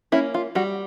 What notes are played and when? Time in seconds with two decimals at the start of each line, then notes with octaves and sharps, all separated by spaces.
0.12 A#3 C#4 E4
0.34 F4
0.55 G3 F#4